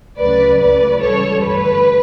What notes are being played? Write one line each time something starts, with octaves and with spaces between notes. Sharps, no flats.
D2 C#3 F#3 B4 D5
C#2 C#3 F#3 A3 B4 D5
C#2 C#3 E3 G3 A4 C#5
G2 D3 A3 B4